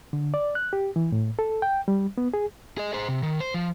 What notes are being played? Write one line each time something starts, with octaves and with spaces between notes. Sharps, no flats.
D3
D5
F#6
G4
E3
A2
A4
G5
G3
B3
G#4
G#4 D#5
G#4 C5
C3
D#3
C5
F3